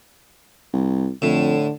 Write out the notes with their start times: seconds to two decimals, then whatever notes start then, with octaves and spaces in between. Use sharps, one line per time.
0.73 C2
1.22 F2 A2 D3